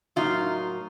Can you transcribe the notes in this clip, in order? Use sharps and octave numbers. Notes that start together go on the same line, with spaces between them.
A2 F#3 A#3 D#4 F4